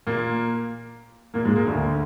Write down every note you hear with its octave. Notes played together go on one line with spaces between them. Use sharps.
A#2 A#3
A#2 A#3
G#2 G#3
A#2 A#3
D2 D3